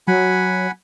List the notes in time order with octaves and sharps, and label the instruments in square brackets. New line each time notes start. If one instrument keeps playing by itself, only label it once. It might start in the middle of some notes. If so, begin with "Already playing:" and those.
[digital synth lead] F#3 [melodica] F#5 G#5 B5